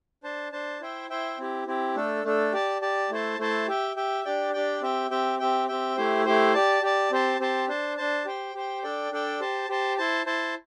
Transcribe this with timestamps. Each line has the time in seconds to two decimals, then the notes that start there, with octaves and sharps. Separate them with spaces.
0.23 D4 C5 A5
0.52 D4 C5 A5
0.81 E4 C5 E5 G5
1.10 E4 C5 E5 G5
1.38 C4 E4 G4
1.67 C4 E4 G4
1.96 A3 D4 A4
2.24 A3 D4 A4
2.52 G4 D5 A5
2.81 G4 D5 A5
3.10 A3 E4 C5 A5
3.39 A3 E4 C5 A5
3.67 G4 E5 G5
3.96 G4 E5 G5
4.25 D4 G4 D5 G5
4.53 D4 G4 D5 G5
4.82 C4 G4 E5 G5
5.10 C4 G4 E5 G5
5.39 C4 G4 E5 G5
5.68 C4 G4 E5 G5
5.97 A3 E4 G4 C5
6.25 A3 E4 G4 C5
6.54 G4 D5 A5
6.82 G4 D5 A5
7.11 C4 G4 C5 A5
7.40 C4 G4 C5 A5
7.68 D4 C5 A5
7.97 D4 C5 A5
8.25 G4 C5 G5
8.54 G4 C5 G5
8.83 D4 A4 D5 G5
9.11 D4 A4 D5 G5
9.40 G4 C5 A5
9.69 G4 C5 A5
9.97 E4 C5 A5
10.26 E4 C5 A5